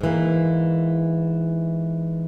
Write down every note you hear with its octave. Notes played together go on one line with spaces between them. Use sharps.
G#2 E3 A#3